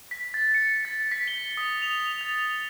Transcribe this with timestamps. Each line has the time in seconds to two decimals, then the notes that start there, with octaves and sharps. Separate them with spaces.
0.11 B6
0.34 A6
0.55 C#7
0.85 A6
1.12 B6
1.28 G7
1.57 D#6
1.82 F7
2.21 A6